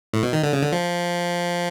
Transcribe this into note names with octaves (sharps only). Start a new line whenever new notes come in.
A2
B2
D#3
D3
C#3
D3
F3